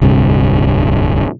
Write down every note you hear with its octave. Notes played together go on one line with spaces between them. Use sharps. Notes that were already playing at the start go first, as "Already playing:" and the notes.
D1 C2 G2 C3